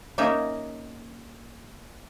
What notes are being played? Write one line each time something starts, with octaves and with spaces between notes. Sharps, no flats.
A#3 C#4 D#4 G#4 A#4 E5